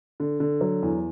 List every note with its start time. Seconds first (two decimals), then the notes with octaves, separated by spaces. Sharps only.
0.20 D3
0.40 D3
0.61 F#3
0.83 E2